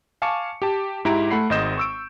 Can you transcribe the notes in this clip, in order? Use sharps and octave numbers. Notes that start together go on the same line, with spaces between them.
F5 G#5 A5 C#6 D6 C#7
G4 A5
G#2 E4 G4 A#5 D7
A3 F#5 B5 C7
G#1 G#2 D#5 G6 E7
C#6 E6 D7